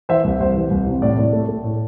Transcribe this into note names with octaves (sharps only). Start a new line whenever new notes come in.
E3 C5 E5
C2
C2 C5
E3
C2
C3
A2 D5
A2
A3
A3
A2